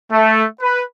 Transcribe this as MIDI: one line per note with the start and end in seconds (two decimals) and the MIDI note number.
0.12 0.44 57
0.61 0.81 71